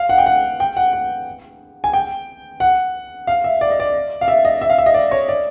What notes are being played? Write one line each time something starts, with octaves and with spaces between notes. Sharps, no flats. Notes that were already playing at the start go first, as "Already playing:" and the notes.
Already playing: F5
F#5
G5
F#5
G5
F#5
F#5
G#5
G5
F#5
F5
E5
D5
D#5
D5
F5
E5
D#5
E5
F5
E5
D#5
D5
C#5
D5